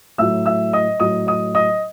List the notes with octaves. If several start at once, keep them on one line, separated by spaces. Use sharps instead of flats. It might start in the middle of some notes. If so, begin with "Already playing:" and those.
A2 F#3 E5 E6
E5 E6
D#5 D#6
A2 F#3 D#5 D#6
D#5 D#6
D#5 D#6